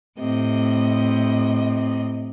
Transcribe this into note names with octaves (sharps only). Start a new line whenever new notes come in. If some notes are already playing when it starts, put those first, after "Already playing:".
A2 C3 D#5